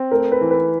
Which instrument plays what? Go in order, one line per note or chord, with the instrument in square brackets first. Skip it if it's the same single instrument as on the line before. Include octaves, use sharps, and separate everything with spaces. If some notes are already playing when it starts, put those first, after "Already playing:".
Already playing: [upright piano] C4
[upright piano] A3 [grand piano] A#4
[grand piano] B4
[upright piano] E3
[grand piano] B4